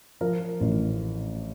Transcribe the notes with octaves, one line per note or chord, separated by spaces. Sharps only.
F3 A#4
A1